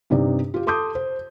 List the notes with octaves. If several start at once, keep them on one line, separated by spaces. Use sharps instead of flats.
G2 C3 D#4 D5
F4 G4
A4 A5 C6 D6 D#6 G6
C5